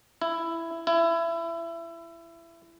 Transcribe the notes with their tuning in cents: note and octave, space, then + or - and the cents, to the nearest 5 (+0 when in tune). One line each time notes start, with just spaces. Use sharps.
E4 +10
E4 +25